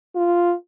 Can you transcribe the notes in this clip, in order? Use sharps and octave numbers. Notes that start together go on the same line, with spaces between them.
F4